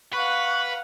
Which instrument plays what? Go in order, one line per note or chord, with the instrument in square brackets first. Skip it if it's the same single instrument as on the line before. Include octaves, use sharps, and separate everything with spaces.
[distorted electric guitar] B4 [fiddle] F5 F#5 [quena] C#6